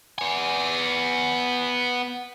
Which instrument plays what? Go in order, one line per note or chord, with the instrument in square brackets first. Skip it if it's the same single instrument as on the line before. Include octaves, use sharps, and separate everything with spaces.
[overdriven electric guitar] B3 G#5